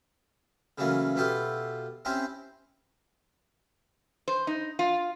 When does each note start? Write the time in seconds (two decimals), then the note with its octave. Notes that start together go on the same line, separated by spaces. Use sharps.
0.78 C#3 E3 F#3 A3 A#3 C#4
1.16 B2 E4 F4 G4 A4
2.05 C4 C#4 E4 G4 C5
4.28 C5
4.47 D#4
4.79 F4